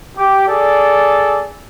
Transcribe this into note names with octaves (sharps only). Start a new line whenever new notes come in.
G4
G#4 A4 D5